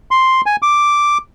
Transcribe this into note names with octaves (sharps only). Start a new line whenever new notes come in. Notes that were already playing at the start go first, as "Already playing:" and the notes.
C6
G#5
D6